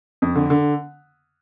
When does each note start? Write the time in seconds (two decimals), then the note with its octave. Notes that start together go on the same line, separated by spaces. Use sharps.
0.22 F2
0.35 D3
0.50 D3